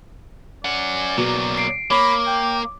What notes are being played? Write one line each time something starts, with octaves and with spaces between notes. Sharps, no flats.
C#4 D5 F#5
B2 F#3 A#3
C7 D7
A#3 C#5 B5 D6
G5